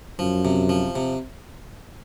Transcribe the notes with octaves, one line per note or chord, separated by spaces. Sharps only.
F#2 F3
C3
F3
C3